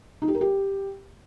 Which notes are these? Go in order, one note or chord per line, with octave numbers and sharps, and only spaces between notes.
D#4
G4
A#4
G4